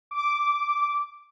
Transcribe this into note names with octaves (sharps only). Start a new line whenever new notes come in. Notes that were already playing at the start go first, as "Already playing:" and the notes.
D6